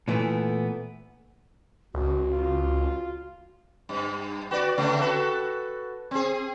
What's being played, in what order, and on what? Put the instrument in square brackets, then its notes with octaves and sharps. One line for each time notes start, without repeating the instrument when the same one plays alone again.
[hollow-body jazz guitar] A#2 E3 A3 B3
[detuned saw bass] C#2 [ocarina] F#4
[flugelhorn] F4
[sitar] G2
F#4 B4 D5
C#3 A3 B3
F#4 A4 B4
C4 G#4